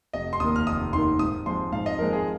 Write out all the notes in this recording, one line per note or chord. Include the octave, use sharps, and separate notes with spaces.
F1 D#5
C6
D#2 D#3 A#3 D#6
F6
F1 D#6
D#2 D#3 A#3 C6
G#2 D#6
F3 G#3 C4 C6
G#2 F5
D#5
F3 G#3 C4 A#4
G#4